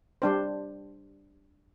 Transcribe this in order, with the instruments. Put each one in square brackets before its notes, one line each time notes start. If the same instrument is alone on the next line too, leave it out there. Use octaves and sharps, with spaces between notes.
[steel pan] G3 D4 C5